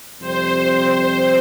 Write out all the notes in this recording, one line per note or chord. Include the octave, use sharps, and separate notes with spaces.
F2 C3 G3 C4 C5